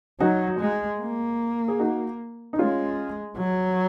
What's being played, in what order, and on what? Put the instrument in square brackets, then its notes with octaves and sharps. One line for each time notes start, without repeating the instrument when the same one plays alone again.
[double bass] F#3 [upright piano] D#4 F#4
[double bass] G#3
A#3
[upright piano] G#4
D#4 F#4
D#4
[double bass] G#3 [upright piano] C#4 F4
[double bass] F#3